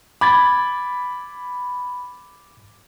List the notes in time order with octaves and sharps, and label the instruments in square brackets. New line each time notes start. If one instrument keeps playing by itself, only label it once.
[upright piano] B5 [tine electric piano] D6 G#6 A6